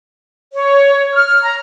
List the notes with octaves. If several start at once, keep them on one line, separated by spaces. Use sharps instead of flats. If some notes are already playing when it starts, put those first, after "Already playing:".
C#5
F6
A#5